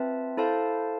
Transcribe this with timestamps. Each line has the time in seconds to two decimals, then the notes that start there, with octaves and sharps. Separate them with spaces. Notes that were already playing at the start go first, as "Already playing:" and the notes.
Already playing: C4 F4 B4 E5 A5
0.37 E4 A4 C5 F5 A5